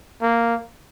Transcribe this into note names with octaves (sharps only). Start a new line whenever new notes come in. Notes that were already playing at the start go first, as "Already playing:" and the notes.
A#3